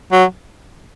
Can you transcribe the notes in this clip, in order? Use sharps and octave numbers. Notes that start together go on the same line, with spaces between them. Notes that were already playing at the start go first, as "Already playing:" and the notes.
F#3